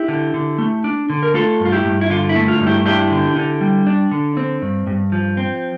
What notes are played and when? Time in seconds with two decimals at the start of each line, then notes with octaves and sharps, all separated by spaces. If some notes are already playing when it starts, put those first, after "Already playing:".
Already playing: E4 G4
0.08 D3
0.34 D3
0.58 A3
0.84 D4
1.10 D3
1.23 A#4
1.34 A3 F4 A4
1.60 G2
1.65 F4
1.72 E4 G4
1.85 G2
2.01 E4
2.10 D3 F4
2.29 E4
2.36 A3
2.48 F4
2.60 G2
2.66 E4 G4
2.86 D4 E4 G4
3.11 D3
3.36 D3
3.61 G3
3.87 D4
4.11 D3
4.37 C4
4.62 G2
4.87 G2
5.12 F3
5.37 C4